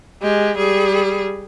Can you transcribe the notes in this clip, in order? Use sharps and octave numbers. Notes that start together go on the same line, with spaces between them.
G#3 G4
G3 G#4